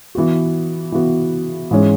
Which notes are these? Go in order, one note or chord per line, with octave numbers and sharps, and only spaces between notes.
E3 B3 F#4
E3 B3 F#4
G#2 E3 G#3 C#4